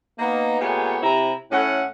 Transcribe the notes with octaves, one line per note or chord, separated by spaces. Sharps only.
A#3 B3 D#4
A#2 A3 B3 G4 G#4 C#5
C3 E4 A#5
A2 C#4 F#5